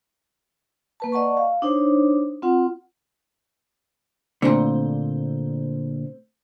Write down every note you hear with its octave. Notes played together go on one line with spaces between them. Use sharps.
A#3 B4 A5
D5 D#5 F#5 A5 C#6
F5
D4 D#4 C5 C#5
C4 F4 F#5
A#2 D3 A3 C4 C5